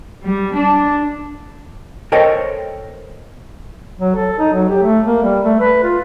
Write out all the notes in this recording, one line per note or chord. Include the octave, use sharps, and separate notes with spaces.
G3
D4
A4 A#4 C5 C#5 D#5 G5
F#3
A4
D#4
F#3
G4
A3
A#3
G3
A3
B4
F4